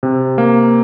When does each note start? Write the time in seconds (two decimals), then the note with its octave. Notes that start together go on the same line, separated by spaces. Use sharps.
0.03 C3
0.38 A#3